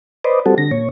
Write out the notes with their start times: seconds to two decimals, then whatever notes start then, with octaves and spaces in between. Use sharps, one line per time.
0.25 B4 C5 D5 D#5
0.46 G3 C4 F#4 A4
0.58 D3 A#6
0.71 A#2 C#5